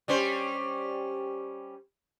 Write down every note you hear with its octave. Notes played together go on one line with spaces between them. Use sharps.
G3 C#4 C5